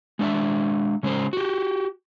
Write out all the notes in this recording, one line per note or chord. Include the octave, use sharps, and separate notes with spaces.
G#3 D4 D5 E5
C#3 G#3 C#4 C5
F#4 G4